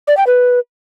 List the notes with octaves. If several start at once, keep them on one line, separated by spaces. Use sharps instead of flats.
D5
G5
B4